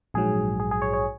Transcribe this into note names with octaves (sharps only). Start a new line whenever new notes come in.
A#1 G#2 F#3 G#4
G#4
G#4
C#5
C#5